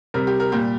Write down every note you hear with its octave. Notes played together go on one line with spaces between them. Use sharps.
C3 G3 A#4
G4
A#4
A#2 G3 G4